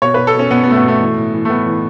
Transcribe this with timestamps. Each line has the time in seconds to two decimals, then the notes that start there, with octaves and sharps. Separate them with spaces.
0.02 B2 C#5
0.14 B2 B4
0.27 A4
0.34 B2 C#4
0.51 B2 B3
0.64 B3
0.68 B2 A3
0.76 B3
0.84 B2 A3
1.00 E3
1.17 A2
1.34 E3
1.45 A3
1.50 A2 B3
1.66 E3